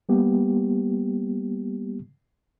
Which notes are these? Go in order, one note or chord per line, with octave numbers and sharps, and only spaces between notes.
G3 A#3 B3 G4